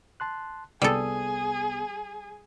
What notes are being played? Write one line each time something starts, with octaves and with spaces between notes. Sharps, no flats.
A5 C6 F#6
C2 G3 B3 G#4 A4 D#6